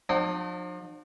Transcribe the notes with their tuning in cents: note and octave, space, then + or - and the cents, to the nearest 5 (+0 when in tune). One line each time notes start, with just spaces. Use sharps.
F3 +40 D#4 -45 G5 -35